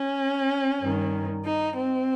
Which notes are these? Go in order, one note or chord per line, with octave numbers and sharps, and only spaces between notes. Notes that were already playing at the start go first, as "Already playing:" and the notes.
Already playing: C#4
G2 D#3
D#4
C4